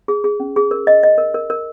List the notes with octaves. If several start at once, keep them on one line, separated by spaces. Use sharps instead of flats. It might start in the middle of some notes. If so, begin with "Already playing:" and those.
G#4
G#4
C#4
G#4
A#4
D#5
D#5
A#4
A#4
A#4